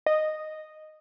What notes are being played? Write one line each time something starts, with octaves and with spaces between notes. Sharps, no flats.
D#5